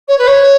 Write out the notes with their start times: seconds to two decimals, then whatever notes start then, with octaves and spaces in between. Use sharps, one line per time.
0.08 C#5
0.18 B4
0.27 C#5